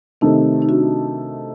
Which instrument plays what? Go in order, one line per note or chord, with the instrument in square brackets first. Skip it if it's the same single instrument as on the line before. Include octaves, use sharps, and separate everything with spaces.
[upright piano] C3 D#3 A3 [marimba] C4 D#4
[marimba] D#4
D4 F#4